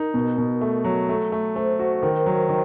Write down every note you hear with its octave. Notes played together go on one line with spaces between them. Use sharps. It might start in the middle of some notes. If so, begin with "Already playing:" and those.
Already playing: D#4 A#4
B2
B2
A3
F#3
A3
A3
A3 C5
F#4
D#3 A#4
F#3
D#3